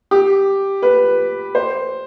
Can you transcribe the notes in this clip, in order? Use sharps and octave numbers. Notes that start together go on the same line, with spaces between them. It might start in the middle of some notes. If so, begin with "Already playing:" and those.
G4
B4
C5